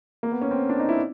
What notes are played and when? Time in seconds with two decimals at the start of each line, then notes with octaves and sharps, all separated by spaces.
0.23 A#3
0.32 B3
0.41 C#4
0.51 C4
0.69 D4
0.80 D#4
0.89 E4